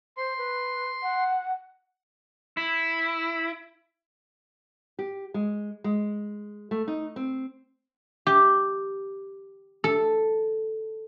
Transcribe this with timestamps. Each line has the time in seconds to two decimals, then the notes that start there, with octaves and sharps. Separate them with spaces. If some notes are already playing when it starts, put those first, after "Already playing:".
0.17 C5 C6
0.38 B4
1.02 F#5
2.57 E4
4.99 G4
5.34 G#3
5.84 G#3
6.71 A3
6.88 D#4
7.16 C4
8.27 G4
9.84 A4